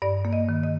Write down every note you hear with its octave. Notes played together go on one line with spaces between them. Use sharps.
G2 D5
A#3
D#5
D#3
D#5